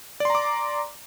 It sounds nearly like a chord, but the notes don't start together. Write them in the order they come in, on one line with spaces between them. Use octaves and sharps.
D5 C6 A#5 D6